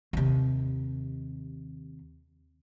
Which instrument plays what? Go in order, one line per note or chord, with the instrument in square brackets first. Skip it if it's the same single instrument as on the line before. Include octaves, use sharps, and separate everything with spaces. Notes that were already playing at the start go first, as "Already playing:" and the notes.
[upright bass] D#2 C3